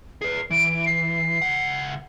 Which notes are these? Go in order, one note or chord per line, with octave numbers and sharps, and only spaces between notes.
G#4 B4 C7
E3 D7
C7
C#2 F#5